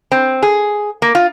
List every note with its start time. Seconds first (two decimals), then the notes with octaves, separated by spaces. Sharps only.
0.12 C4
0.43 G#4
1.02 A#3
1.15 F4